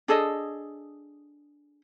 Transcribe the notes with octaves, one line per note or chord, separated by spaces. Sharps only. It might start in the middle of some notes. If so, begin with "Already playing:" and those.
D4 G#4 A4 D#5